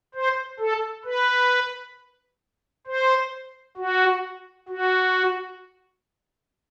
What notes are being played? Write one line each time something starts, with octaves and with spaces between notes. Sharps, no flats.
C5
A4
B4
C5
F#4
F#4